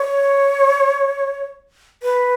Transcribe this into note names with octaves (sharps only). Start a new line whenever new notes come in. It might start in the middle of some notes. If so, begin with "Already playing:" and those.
Already playing: C#5
B4